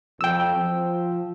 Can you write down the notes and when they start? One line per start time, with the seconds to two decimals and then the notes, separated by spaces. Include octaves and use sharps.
0.21 F2 G5 E6
0.56 F3